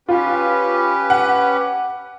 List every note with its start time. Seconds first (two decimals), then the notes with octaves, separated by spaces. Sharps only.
0.09 C#4 F4 G4 B4
1.10 F#5